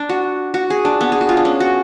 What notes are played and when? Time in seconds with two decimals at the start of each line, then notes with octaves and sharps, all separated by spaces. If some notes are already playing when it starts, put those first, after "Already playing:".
Already playing: D4
0.09 F#4
0.54 F#4
0.70 G#4
0.85 D4
1.01 B3
1.12 G#4
1.21 F#4
1.29 F4
1.37 D4
1.45 C#4
1.60 F#4